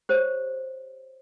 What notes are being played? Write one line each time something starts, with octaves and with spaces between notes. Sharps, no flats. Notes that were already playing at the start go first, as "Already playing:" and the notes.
G4 C5 C#5